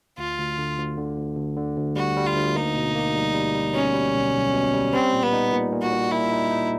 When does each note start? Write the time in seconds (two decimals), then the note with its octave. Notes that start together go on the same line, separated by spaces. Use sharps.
0.18 D2 F4
0.38 D2
0.58 D3
0.78 D2
0.98 D3
1.17 D2
1.36 D2
1.57 D3
1.77 D2
1.96 G3 F#4
2.17 G3
2.26 F4
2.36 D2
2.55 A#3 D#4
2.75 B2
2.95 A#3
3.16 G3
3.34 G3
3.54 G3
3.74 B2 C#4
3.94 G3
4.14 B1
4.34 B1
4.53 B2
4.74 G3
4.93 G3 C4
5.13 A#2
5.23 B3
5.33 D#4
5.52 A#2
5.72 A#2
5.82 F#4
5.93 A#2
6.12 A#2 E4
6.32 D#4
6.51 D#4